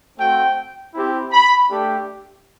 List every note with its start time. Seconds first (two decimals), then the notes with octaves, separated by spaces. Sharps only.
0.17 A3 C4 F#4 G5
0.94 C4 E4 G4
1.32 B5
1.70 A3 D4 G4